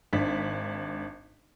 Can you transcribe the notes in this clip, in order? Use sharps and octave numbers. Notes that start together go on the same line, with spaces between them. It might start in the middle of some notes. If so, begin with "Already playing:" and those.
G#1 D4 B6